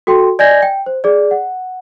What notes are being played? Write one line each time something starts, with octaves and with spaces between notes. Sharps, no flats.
F#4 A4 G5 C6
D5 D#5 G#5 G6 G#6 A#6
G5
C5
G#4 D5
F#5